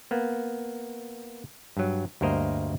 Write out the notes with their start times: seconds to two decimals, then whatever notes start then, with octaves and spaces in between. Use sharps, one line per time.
0.11 A#3 B3
1.77 G2 F#3
2.21 D2 G2 A#3 A#4 C5 D#5